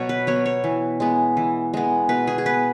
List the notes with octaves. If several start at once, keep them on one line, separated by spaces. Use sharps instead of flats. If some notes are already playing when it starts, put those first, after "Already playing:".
Already playing: B2 F#3 C#5
B4
F#3 B3 C#5
C#5
E3
G#3 B3
E3
G#3 B3
B2 B4
G#4
G#4
B3 B4